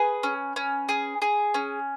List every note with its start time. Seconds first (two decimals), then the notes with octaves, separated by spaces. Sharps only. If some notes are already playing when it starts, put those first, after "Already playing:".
Already playing: G#4 B4
0.23 C#4
0.56 C#4
0.89 G#4
1.22 G#4
1.54 C#4